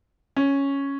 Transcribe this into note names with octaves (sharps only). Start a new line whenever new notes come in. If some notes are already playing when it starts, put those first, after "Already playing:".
C#4